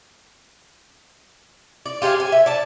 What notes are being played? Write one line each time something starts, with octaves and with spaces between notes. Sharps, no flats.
D5
F4 G4 G#4 F5
G#5
E5
D5 A5